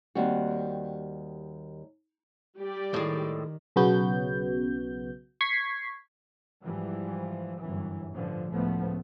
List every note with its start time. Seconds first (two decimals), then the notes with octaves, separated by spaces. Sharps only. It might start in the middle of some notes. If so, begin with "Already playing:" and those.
0.15 D#2 G3 C4 F#4
2.57 G3 G4 D5
2.94 A2 D#3 G#3
3.76 B1 C#3 F#3 B3 F#4 G6
5.41 C#6 G#6 B6 C7
6.62 G#2 E3 F3 G3
7.58 G1 F#2 E3
8.12 A1 G2 D3 F3
8.51 C#2 A2 F3 A3 B3